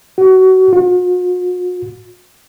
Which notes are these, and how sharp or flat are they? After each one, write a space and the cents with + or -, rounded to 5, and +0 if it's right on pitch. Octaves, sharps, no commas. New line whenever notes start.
F#4 +25
F#4 -45